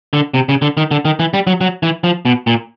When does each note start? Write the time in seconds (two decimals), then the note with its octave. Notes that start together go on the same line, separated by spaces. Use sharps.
0.13 D3
0.34 C3
0.49 C#3
0.62 D3
0.77 D#3
0.91 D3
1.05 D#3
1.20 E3
1.34 G3
1.47 F#3
1.61 F#3
1.83 E3
2.04 F3
2.25 B2
2.47 A#2